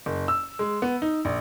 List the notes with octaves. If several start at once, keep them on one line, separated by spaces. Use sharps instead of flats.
F#1
E6
G#3
B3
D#4
A#1